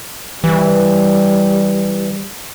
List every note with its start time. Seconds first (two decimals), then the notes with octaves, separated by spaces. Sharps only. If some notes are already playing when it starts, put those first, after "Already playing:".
0.44 E3 G3